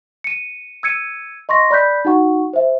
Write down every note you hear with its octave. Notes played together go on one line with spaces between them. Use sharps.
C#7 D#7
E6 G#6 C#7 D#7
D#5 C6 C#6 A#6
D5 B5 F#6 G6 B6
D#4 F#4 F#5 C#6
C5 E5